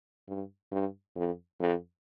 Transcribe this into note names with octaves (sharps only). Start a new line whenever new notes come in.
G2
G2
F2
F2